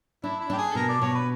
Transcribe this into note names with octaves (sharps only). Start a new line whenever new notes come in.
D4 E4
E4
D4 G4
G#4
A4
B2 A#4
D5
B2 C#5
B4